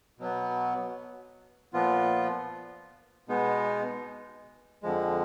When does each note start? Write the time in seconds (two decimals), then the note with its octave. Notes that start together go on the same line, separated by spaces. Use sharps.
0.19 B2 F#3 B3
1.73 A#2 F3 B3 F4
3.28 B2 G#3 B3 D#4
4.83 F2 D3 F3 G#3